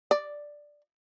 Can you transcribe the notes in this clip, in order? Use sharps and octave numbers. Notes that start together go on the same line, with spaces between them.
D5